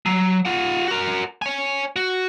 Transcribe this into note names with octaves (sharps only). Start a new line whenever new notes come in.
F#3
F4 F#5
F#4 A#4
C#5 G#5
F#4